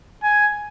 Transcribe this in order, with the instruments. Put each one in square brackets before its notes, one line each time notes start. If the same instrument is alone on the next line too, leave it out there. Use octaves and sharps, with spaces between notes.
[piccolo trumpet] G#5